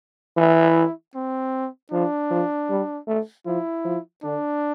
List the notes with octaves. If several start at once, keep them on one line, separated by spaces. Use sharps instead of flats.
E3 E4
C4
F3 D4
F3
G3
A3
F3 E4
F3
D3 D4